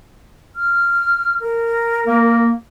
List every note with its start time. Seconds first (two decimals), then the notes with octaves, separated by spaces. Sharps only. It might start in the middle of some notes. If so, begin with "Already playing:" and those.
0.56 F6
1.40 A#4
2.07 A#3